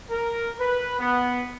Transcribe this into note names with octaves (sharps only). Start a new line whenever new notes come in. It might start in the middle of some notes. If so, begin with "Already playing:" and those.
A#4
B4
B3